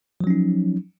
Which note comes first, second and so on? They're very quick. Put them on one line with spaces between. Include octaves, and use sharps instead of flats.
F3 F#3 C#4 D#4